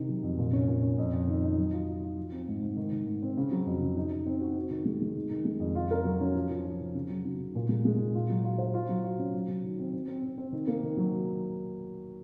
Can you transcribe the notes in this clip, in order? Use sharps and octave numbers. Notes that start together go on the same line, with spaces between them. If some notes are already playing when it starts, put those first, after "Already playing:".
Already playing: C3 D#3
F#3
F2
A#2
C#4
A#2
C#4
F2
F2
D#3
D#4
F#3
F4
F4
F4
F3
C4
G#2
G#2
D#3
D#3
G#2
C4
C#3
F#3
F2
C#3
D#4
D#4
C4
F#4
C4
D#3
G#3
G#3
D#3
D#3
G#3
F2
F4
A#4
F#3
C#4
F3
F3
F3
F3
C#3
F#3
C#3
C#3
A#2
G#3
G#3
A#2
F4
F#3
F4
C5
F4
F#3
F4
C#4
F#3
F#3
D#3
C4
C4
C4
C4
C4
D#3
A#3
D#3
F#3